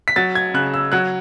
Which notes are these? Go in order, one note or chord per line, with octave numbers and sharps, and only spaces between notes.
B6
F#3 A6
G#6
C#3 F#6
E6
F#3 F#6